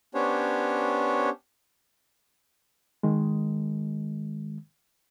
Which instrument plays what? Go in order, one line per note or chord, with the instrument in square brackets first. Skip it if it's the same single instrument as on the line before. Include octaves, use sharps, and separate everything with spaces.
[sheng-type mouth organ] B3 C#4 D4 G4 C5 C#5
[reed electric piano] D#3 G#3